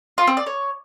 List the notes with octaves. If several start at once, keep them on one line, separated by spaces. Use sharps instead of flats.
F4
C4
D5
C#5